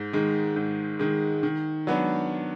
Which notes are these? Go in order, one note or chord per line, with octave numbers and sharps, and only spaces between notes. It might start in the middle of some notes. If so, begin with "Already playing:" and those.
Already playing: G#2
D#3 G#3
G#2
D#3 G#3
D#3
F#3 B3 D4